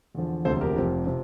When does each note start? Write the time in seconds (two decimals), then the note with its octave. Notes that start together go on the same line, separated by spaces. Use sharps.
0.15 E2 D3 F3
0.45 E1 D2 C3 F3 A4 C5
0.61 G4 A#4
0.76 F1 F2 C3 F3
1.07 C3 F3